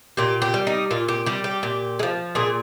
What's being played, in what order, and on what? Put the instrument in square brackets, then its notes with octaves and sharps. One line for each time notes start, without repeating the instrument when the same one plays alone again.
[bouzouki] A#2 G4
G4
G3
D#4
A#2 F4
G4
G3 G4
G4
A#2
G#3
F3
A#2 G#4